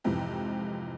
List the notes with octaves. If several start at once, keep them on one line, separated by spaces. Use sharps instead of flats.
F2 G#2 C3 E3